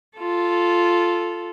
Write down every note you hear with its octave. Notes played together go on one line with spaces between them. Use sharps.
F4 A4